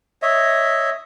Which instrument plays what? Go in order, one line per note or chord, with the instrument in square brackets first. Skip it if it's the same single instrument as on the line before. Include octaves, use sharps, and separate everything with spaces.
[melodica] C#5 D#5 E5